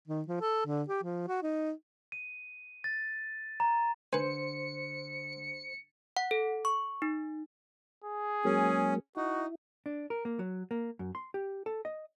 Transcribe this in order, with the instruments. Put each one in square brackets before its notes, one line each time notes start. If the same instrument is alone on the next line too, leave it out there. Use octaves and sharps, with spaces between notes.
[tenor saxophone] D#3
F3
A4
D3
G4
F3
F#4
D#4
[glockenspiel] D#7
A6
A#5
[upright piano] D3 [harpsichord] B4 G#5 [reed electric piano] C5 [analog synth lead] C#7
[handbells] F#5
A4
C#6
D#4
[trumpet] G#4
[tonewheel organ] F#3 G#3 A#3 [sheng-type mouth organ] C#4
[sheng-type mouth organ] D#4 [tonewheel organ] E4 [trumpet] F#4
[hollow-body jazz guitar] D4
A#4
A#3
F#3
A#3
F#2
C6
G4
A4
D#5